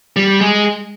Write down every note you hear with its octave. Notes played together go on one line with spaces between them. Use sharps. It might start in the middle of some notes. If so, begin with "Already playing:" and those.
G3
G#3